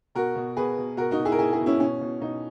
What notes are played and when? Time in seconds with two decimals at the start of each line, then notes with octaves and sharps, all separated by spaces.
0.15 B2 F#4 A#4
0.36 B2
0.57 B2 G#4 B4
0.78 B2
0.97 B2 F#4 A#4
1.11 D#4 F#4
1.19 B2
1.25 E4 G#4
1.32 A#4
1.39 B2 E4 G#4
1.53 E4 G#4
1.60 B2
1.66 C#4 E4
1.80 B2 C#4
2.01 B2
2.21 B2 D#4